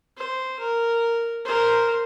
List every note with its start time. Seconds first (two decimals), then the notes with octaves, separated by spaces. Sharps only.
0.18 C5
0.60 A#4
1.45 A#4 C5